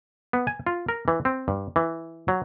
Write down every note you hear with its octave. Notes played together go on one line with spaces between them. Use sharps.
B3
G#5
F4
A#4
E3
C4
G2
E3
F#3